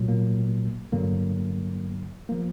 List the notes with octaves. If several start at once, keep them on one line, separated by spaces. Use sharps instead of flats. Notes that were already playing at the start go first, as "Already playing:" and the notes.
Already playing: A#2 F#3
A#3
G2 D3 F#3 A#3
F3 A#3